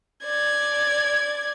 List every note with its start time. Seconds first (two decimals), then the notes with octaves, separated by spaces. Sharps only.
0.25 D5 G#6